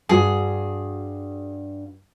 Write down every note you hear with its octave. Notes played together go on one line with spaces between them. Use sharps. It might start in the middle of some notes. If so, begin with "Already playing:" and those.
G2 F#4 G#4